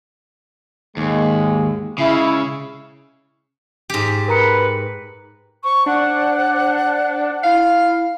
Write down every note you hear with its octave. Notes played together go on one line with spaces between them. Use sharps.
D#2 G#2 G#3
C#3 G#3 E4
G#2 G4
A#4 B4 A#5 C#7
C5 C#6
D4 F#5
E4 F5